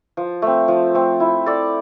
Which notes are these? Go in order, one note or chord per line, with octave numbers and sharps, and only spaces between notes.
F3
A3 C4
F3
A3 C4
E4
A4 D5